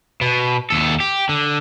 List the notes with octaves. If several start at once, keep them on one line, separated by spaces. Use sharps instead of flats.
B2
D#2 A4
G4
D3